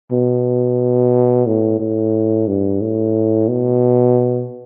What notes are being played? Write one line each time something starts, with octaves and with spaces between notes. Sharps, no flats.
B2
A2
A2
G2
A2
B2